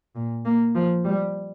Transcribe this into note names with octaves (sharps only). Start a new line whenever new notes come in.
A#2
A#3
F3
G3